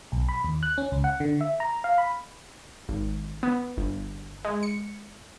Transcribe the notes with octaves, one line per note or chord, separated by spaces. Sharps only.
B1
B5
D#2
F#6
C#4
C#2
F#5
D3
E5
A#5
F5
B5
G#1
B3
G1
G#3
C#7